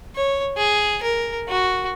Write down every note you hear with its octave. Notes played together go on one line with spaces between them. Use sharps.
C#5
G#4
A#4
F#4